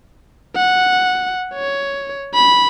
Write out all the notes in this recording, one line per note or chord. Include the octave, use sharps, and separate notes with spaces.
F#5
C#5
B5